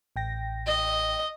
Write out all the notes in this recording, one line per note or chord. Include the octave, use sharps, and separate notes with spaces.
A1 G5 A#6
D#5